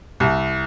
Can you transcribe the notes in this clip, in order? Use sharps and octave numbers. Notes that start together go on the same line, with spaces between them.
C2